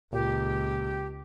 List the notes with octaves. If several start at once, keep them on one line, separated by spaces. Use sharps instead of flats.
C#2 A#2 G4